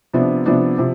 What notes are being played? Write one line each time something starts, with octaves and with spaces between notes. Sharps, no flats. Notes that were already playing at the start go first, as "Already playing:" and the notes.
C3 F3 B3 D4
C3 F3 B3 D4
C3 F3